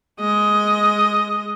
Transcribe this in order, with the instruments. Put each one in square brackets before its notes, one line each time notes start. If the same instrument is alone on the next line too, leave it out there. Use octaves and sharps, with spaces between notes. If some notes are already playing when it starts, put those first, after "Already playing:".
[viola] G#3 D#5